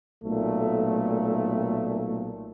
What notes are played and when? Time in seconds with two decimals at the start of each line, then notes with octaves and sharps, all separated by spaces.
0.25 B1 A#2 A3